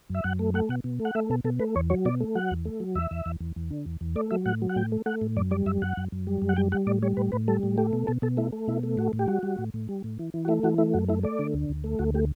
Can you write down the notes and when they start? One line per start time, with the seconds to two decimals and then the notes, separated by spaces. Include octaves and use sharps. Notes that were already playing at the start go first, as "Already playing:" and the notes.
0.10 F#2 E5
0.24 F#2 F#5
0.39 A3
0.54 A3 F#5
0.69 B2 F#5
0.84 B2
1.00 A3
1.05 F#5
1.15 A3 E5
1.30 B2 A4
1.44 B2 A4
1.59 A3 B4
1.76 E2 C#5
1.90 F#3 C#5
2.05 B2 D5
2.20 A3
2.35 F#3 F#5
2.51 E2
2.65 A3
2.80 F#3
2.95 E2 E5
3.11 E2
3.26 E2
3.40 E2
3.56 E2
3.71 D3
3.86 E2
4.01 E2
4.15 A3 D5
4.31 F#3 E5
4.46 A2 F#5
4.62 F#3
4.69 F#5
4.76 A2 G5
4.92 A3
5.06 A3 F#5
5.21 A2
5.37 F#2 D5
5.51 G3 D5
5.66 F#2 E5
5.82 F#2 F#5
5.97 F#2
6.12 F#2
6.27 G3
6.42 F#2
6.49 F#5
6.56 G3 G5
6.72 G3 F#5
6.87 A2 D5
7.02 G3 C#5
7.17 A2 B4
7.32 A2 B4
7.48 G3 A4
7.63 A2
7.78 A3 G4
7.93 B2
8.07 B2 A4
8.22 B2 A4
8.37 A3 E4
8.52 A3
8.68 B2 E4
8.83 A3
8.97 A2 F#4
9.13 A2
9.19 G4
9.28 G3 F#4
9.43 G3
9.58 A2
9.74 A2
9.89 G3
10.04 A2
10.19 E3
10.34 E3
10.45 F#4
10.48 A3 E4
10.63 E3 F#4
10.78 A3 E4
10.94 F#2 F#4
11.08 A3 E4
11.23 A3 D5
11.39 D3
11.54 D2
11.69 D2
11.84 A3
11.99 D2 F#4
12.14 A3 G4